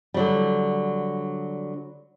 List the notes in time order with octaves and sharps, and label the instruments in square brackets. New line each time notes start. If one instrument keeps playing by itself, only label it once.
[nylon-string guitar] D3 F#3 G3